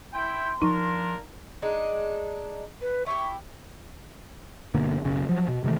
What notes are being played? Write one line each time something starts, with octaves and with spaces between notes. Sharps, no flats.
E4 G5 C6
F3 A#3 D4 D#4 A#4
G#3 D4 D#4
B4
E4 G4 C#6
G1 B2 D3 A#3
F#1 B1 C#3 C#4
F3 F#3
B2
C3 D#3 E3 A3